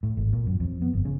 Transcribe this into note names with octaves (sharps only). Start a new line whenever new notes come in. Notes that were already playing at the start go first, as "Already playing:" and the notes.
A2
G#1
A#2
F#2
F2
B3
G1
C#3